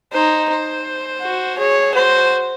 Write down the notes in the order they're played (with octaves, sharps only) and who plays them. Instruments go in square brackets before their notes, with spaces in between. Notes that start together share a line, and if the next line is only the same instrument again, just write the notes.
[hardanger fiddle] D#4 [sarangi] C5
[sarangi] C5
[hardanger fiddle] F#4
[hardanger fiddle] G#4 [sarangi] C#5
[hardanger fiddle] F#4 [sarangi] C5